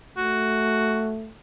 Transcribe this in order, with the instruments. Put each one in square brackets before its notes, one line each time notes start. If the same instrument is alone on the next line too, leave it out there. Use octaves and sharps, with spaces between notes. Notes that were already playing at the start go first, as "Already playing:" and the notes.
[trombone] A3 [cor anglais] F#4